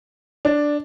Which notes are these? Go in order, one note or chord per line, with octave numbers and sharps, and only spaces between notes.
D4